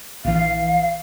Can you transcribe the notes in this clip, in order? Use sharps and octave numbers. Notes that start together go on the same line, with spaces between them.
A#1 E3 F5